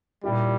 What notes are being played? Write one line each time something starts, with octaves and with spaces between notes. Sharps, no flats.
A#2 G3 A#3 E4 G4